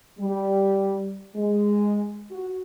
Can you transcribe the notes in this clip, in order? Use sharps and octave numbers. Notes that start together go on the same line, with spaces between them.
G3
G#3
F#4